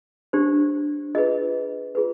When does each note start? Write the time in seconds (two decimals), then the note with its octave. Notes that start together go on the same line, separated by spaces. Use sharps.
0.33 D4 G4 C5
1.15 F4 G#4 B4 D#5
1.95 F4 G#4 B4